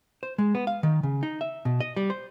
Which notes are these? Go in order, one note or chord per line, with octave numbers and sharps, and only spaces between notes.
C5
G#3
B3
F5
D#3
C#3
D#4
E5
B2
D#5
G3
C5